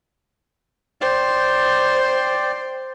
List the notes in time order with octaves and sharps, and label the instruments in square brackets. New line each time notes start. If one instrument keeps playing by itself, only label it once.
[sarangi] C5 [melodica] D5 G5